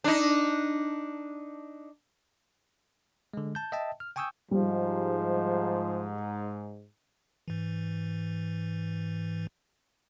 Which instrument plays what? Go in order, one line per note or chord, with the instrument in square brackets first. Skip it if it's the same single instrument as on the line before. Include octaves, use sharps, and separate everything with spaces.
[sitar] D4 D#4
[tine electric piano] D3 G#3
A5 G6
D#5 E5 G5 A5
F6
G5 G#5 C#6 D#6 E6 G6
[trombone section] G#2 [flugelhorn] F3 [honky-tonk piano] G3
[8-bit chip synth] G#2 E3